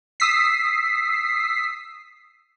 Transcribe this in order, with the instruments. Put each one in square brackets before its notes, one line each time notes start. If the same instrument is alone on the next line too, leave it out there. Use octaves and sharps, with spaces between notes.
[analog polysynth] D#6 E6 B6 C7